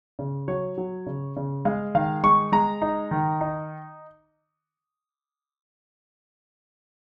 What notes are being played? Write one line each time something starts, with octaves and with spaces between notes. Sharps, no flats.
C#3
F#3 C#5
F#3
C#3
C#3
G#3 F5
D#3 F5
G#3 C#6
G#3 A#5
D#4
D#3
D#4